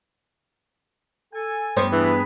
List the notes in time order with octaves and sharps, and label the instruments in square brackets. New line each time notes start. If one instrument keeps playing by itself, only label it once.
[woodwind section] A4 G#5
[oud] G2 B3 C#5 [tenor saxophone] C5
[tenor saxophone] E3 [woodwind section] D4 G#4 B4